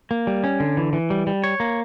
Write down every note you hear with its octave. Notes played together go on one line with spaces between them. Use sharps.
A#3
G3
C#4
D3
E3
E3
G3
G3
C#5
A#3